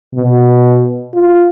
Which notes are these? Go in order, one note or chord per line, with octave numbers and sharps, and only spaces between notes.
B2
F4